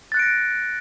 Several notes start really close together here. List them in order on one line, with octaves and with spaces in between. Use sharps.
A6 F#6 C#7 D7 A#6